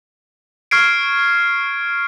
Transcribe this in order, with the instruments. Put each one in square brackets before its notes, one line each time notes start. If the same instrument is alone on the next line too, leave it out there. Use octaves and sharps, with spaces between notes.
[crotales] C#6 F6 G#6 C7 D7